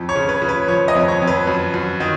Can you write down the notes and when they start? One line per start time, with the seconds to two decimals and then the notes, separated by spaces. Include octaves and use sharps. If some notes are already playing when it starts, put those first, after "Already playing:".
Already playing: F2
0.09 C#5
0.16 C#3
0.29 B4
0.42 C#3
0.49 B4
0.68 F3 C#5
0.88 D#5
0.95 F2
1.08 C#5
1.22 F2
1.27 B4
1.47 F#2
1.74 F#2
2.00 D#3